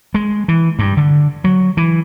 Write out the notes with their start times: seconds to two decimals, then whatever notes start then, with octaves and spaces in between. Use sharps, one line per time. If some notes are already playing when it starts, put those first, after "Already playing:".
0.14 G#3
0.48 E3
0.79 G2
0.97 D3
1.44 F#3
1.77 E3